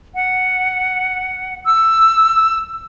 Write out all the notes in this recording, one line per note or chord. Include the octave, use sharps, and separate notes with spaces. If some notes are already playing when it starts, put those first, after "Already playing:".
F#5
E6